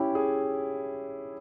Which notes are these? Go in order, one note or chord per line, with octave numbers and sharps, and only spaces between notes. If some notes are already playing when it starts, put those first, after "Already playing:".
Already playing: C#4 E4 G4
G#4